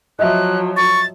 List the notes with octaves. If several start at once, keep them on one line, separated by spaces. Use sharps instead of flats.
F3 F#3 D#5 E5 F#6
C#6 A6